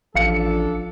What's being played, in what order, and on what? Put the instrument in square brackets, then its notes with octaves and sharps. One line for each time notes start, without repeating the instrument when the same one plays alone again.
[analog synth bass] A1 [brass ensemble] F3 D4 A4 [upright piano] F5 C#7